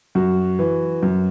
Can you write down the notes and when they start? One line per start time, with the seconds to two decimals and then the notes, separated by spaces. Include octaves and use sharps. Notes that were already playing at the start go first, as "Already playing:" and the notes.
0.15 F#2 F#4
0.59 E3
1.03 F#2